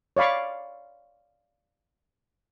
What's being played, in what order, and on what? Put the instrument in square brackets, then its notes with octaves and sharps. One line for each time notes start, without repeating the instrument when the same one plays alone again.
[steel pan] C#5 D5 F5 B5 C#6